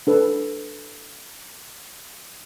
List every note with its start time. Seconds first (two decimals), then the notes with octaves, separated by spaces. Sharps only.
0.07 D4 A4 B4